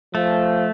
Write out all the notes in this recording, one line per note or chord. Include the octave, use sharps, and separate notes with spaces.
F3 A3